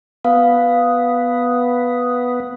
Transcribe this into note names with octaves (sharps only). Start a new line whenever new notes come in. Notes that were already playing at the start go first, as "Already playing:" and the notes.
B3 F5